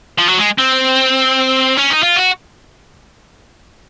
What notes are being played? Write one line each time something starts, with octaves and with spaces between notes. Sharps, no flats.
F3
F#3
G#3
C4
C#4
D#4
F4
F#4